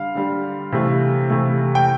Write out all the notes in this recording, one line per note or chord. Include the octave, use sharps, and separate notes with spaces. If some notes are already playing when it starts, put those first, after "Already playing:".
Already playing: D3 G3 F5
D3 G3
C3 E3 A3
C3 E3 A3
G5